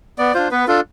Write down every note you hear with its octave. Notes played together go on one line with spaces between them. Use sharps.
B3 D5
D4 F4 C5
B3 B4
D4 F4 A4